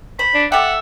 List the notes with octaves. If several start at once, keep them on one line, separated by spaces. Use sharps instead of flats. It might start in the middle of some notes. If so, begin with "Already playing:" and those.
C5 B5
D4
G4 A4 E5 F#5